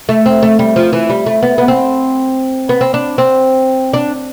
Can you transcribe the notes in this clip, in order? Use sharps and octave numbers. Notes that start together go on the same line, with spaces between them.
A3
C4
A3
G3
F3
E3
G3
A3
B3
B3
C4
B3
C4
D4
C4
D4